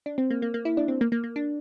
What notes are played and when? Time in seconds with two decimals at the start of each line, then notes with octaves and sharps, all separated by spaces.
0.06 D4
0.18 C4
0.30 A#3
0.42 A#3
0.54 A#3
0.65 E4
0.77 D4
0.88 C4
1.01 A#3
1.12 A#3
1.24 A#3
1.36 D4